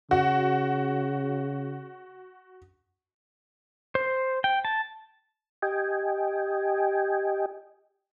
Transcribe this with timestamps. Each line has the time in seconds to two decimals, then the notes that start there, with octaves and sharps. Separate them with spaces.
0.11 C#3 F#4
3.95 C5
4.44 G5
4.65 A5
5.62 G4 D#5 G5 G#5